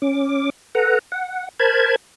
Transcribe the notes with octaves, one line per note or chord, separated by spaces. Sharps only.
C#4 D6
A4 B4 F#5 A#5
F#5
A#4 C5 A5 B5 G#6